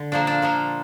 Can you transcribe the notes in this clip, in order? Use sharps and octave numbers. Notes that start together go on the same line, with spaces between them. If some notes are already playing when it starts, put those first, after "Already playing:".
Already playing: D3
A#2 F3 A#3 D4
D4
A#2 F3 A#3